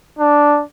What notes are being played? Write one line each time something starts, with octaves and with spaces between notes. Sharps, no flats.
D4